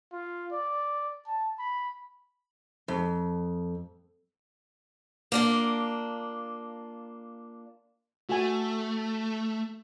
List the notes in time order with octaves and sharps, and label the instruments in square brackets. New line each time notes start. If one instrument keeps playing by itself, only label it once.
[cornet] F4
D5
A5
B5
[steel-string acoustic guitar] F2
A#3 D4 F4
[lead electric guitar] A3 [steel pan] F#4 G#5